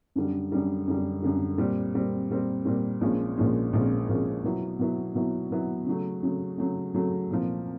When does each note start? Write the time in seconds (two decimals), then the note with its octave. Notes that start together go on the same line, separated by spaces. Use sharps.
0.15 F#2 D3 G3
0.52 F#2 D3 G3
0.87 F#2 D3 G3
1.23 F#2 D3 G3
1.58 A#2 G3 C4
1.94 A#2 G3 C4
2.30 A#2 G3 C4
2.65 A#2 G3 C4
3.01 A#1 A#2 F3 G#3 C#4
3.37 A#1 A#2 F3 G#3 C#4
3.73 A#1 A#2 F3 G#3 C#4
4.09 A#1 A#2 F3 G#3 C#4
4.44 B2 F#3 B3 E4
4.79 B2 F#3 B3 E4
5.15 B2 F#3 B3 E4
5.51 B2 F#3 B3 E4
5.86 C#3 F#3 A3
6.23 C#3 F#3 A3
6.58 C#3 F#3 A3
6.94 C#3 F#3 A3
7.30 C2 A#2 F3